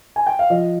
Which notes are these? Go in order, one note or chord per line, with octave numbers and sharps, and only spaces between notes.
G#5
G5
F5
F3 D#5